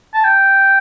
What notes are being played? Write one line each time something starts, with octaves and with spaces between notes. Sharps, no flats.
A5
G5